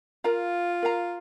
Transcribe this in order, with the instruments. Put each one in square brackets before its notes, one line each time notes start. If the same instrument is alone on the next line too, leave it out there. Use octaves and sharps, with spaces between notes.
[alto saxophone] F4 [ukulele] A#4 F5 A#5
[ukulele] A#4 F5 A#5